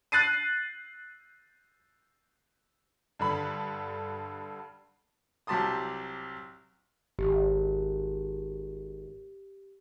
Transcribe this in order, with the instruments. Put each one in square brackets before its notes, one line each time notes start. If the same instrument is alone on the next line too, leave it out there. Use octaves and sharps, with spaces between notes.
[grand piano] F#6 A6 C7 D#7
[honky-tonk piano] G2 D3 B5
[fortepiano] C2 F#3 G4 A5 C6 D#6
[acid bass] G#1 [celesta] G4